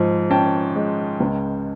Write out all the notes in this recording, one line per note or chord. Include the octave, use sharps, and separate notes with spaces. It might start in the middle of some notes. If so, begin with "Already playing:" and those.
Already playing: G#2 F3
C#4 G5 A5
G#3
C#2